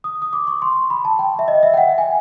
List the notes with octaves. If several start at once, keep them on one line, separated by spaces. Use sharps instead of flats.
D#6
D#6
D6
C#6
C6
B5
A5
G5
E5
D#5
E5
G5
F#5
G#5